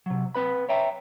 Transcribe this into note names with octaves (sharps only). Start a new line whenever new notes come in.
C3 F#3
C4 B4 B5
C#5 E5 G5 A#5